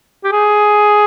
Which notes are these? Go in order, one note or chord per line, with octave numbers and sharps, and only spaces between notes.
G4
G#4